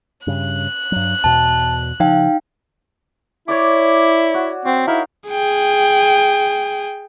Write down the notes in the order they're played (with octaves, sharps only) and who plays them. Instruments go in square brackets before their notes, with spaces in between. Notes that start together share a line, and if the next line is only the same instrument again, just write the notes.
[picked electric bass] G2 C#3 [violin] F#6
[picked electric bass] G2 F#3
[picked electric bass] E2 B2 [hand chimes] A5
[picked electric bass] C#3 F3 [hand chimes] D#4 F5 G5
[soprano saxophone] E4 [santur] C#5 D5 D6
[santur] F#4
[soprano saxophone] C4 [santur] F#4
[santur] D#4 A#4 F5 [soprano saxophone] E4
[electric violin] G#4 G5